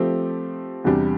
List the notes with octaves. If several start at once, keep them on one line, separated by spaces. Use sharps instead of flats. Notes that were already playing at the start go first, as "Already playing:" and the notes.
Already playing: F3 A3 C4 G4
E2 C3 G3 D4 G4